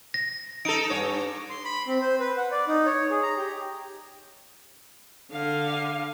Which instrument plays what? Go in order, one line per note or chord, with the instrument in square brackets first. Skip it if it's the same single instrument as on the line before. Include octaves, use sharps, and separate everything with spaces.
[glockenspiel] A#6
[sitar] D#4 A4 [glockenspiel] D7
[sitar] G2 C#5
[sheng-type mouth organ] C6
B5
C4
C5
B4
F#5
D5
D#4
C#5
G#4
A#5
G4
[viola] D3 F5